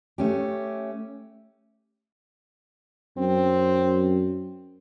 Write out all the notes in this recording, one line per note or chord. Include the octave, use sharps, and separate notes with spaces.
A3 C#4 G4
F#2 C4